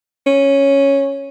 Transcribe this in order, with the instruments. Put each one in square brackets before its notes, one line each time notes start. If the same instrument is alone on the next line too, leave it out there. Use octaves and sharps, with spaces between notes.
[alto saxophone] C#4